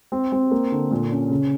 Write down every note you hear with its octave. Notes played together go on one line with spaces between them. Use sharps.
C4
C4
A#3
D3
A#2
C#4
C#3